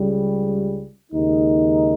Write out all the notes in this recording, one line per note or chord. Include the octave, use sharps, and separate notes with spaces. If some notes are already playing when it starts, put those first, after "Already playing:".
Already playing: C#2 C#3 G3
D#2 C#3 G#3 D#4